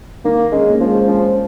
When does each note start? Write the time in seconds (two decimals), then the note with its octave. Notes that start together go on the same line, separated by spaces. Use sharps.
0.25 D#3 A#3
0.52 G#3 C#4
0.70 A#3
0.80 F3 G#3
1.07 F3 C#4